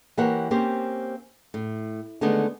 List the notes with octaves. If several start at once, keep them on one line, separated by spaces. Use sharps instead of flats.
E3 A#3 G4 A#4 C#5 F#5
A#3 C4 C#4 G4 C5
A2
D3 D#3 G#3 A3 B3